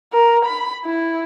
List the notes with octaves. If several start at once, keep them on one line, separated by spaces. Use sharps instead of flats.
A#4
B5
E4